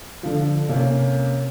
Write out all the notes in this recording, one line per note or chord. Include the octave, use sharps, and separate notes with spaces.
D3 F3
C3 A#3 C#4